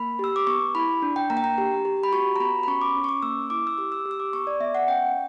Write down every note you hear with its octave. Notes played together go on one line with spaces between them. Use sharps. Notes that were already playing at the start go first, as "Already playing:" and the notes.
Already playing: A#3 B5
G4 E6
D6
B3 C#6
E4 B5
D4
G5
A#3 A#5
G5
A#5
G4
G4
B5
F#4 C#6
A#5
B3 B5
B5
C#4 C#6
D6
C#4
C#6
D6
A#3 E6
E4 D6
E6
G4 D6
E6
G4
E6
D6
B3 C#6
D5
B3 E5
F#5
C#4 G5